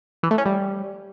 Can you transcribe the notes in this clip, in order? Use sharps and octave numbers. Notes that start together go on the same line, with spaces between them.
E3
A3
C#4
G3